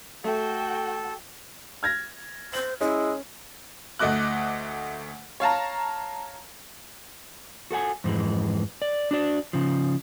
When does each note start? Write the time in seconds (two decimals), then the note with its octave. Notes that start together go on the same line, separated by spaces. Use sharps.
0.24 A3 F#4 A4 G5
1.83 F6 G#6 A#6
2.53 C5 F#7
2.81 G#3 C#4 E4
3.99 D2 A3 D#5 D6 F#6
5.40 C#5 F5 A5 A#5
7.71 F#4 A4 F#5 G#5
8.04 F2 G#2 E3 G#3
8.82 D5
9.11 D4 F#4 D5
9.53 C#3 F3